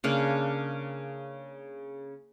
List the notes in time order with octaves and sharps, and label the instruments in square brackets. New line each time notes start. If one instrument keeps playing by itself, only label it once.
[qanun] C#3 A#3 D4